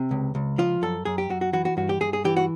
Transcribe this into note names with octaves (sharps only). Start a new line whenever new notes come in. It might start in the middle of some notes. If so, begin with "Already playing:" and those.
Already playing: C3 C4
C#2
C#2
F3 F4
F#2 A4
F#2 G#4
G4
F#2 F#4
F#4
E3 F#4
F#4
G2 F#4
G4
G2 G#4
G#4
E3 G4
F#4